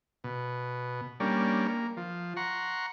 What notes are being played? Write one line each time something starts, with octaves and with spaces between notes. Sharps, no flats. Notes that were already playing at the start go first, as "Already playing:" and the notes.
B2
G3 A#3 C#4 D4
A#3
F3
F#5 A#5 C6 C#6